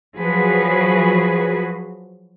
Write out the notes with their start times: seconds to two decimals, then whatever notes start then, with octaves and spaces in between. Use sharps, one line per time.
0.17 F3 F#3 F#4 G#4 B4